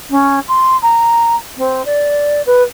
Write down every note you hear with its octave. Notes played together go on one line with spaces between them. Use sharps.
C#4
C6
A#5
C4
D5
B4